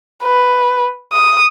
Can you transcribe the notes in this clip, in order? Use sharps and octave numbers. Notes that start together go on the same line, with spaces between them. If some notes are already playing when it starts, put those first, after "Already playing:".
B4
D#6